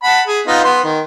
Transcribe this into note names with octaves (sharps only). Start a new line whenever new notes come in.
F#5 A5 B5
G#4
B3 D#4 F4
B3 C6
D#3